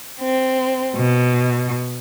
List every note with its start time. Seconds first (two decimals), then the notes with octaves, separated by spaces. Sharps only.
0.21 C4
0.97 B2